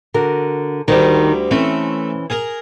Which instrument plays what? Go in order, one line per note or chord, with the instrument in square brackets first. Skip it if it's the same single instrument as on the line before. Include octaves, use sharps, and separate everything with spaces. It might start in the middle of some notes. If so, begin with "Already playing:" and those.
[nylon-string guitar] D3 F#4 A#4
[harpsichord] D2 G3 [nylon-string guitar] D#3
[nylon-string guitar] E3 C4 C#4 [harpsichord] A3
[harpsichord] G#4 A#4